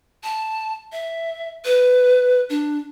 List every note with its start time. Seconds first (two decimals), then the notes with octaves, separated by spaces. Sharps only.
0.23 A5
0.92 E5
1.65 B4
2.50 D4